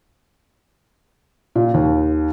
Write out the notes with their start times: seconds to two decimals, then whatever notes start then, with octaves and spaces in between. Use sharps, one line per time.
1.56 A#2
1.74 D#2